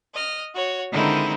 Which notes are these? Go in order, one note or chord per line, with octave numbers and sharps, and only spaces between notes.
D#5 F6
F#4 C#5
D3 D#3 G#3 C4 D#4 E4